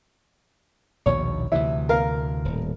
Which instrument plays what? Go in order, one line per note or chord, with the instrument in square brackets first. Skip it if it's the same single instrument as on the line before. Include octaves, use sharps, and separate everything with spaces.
[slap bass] A#1 D#2 B2 [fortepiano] C#5
[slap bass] D2 C3 E3 [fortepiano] E4
[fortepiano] A#4 F5
[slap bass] D#1 A2